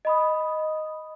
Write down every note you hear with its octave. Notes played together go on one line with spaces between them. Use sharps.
D#5 B5 D#6